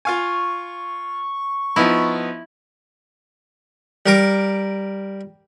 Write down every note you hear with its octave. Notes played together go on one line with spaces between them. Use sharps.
F4 F5 G#5 C#6
F3 B3 D#4 E4
G3 A#4 D6